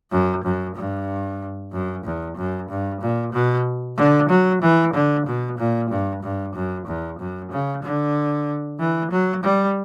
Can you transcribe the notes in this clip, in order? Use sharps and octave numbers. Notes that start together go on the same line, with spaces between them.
F#2
F#2
G2
F#2
E2
F#2
G2
A#2
B2
D3
F#3
E3
D3
B2
A#2
G2
G2
F#2
E2
F#2
C#3
D3
E3
F#3
G3